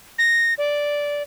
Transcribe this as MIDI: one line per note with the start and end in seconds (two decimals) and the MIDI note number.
0.19 0.54 94
0.58 1.23 74